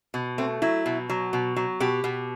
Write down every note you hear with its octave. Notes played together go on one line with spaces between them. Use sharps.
B2
A3 C4
F#3 E4
B2
F#3
B2
F#3
B2 G4
B2